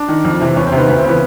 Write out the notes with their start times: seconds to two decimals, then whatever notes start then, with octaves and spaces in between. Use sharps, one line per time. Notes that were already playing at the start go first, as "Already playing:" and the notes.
Already playing: D4
0.08 D#3
0.24 F2
0.40 C3 E3
0.56 E2 C#4
0.67 C4
0.72 C3 D#3 B3
0.87 D2 B3
0.98 C4
1.04 C#3 E3 B3